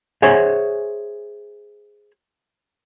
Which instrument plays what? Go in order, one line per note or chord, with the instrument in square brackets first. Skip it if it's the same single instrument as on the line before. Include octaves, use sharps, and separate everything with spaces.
[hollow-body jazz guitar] G#4 C5 C#5 E5 F#5 G#5